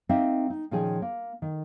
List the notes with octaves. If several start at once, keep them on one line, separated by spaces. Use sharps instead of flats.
A#3 C4 D#4 D#5 E5
D#4
A#2 D#3 F3 C#4 G#4 G#5
A#3
D#3